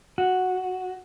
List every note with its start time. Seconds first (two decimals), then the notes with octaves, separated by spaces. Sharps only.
0.18 F#4